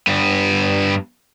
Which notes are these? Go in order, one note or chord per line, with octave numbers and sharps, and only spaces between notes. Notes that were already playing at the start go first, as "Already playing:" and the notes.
G2 B3